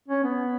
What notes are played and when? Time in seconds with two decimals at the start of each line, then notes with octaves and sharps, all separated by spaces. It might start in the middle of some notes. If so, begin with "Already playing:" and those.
0.08 C#4
0.24 B3